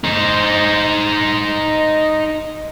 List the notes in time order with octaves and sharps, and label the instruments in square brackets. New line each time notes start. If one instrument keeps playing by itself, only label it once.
[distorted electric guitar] D#4 C5